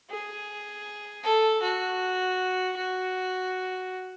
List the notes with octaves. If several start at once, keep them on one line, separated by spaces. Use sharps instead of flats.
G#4
A4
F#4
F#4